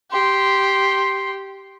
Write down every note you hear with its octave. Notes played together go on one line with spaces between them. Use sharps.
G4 C6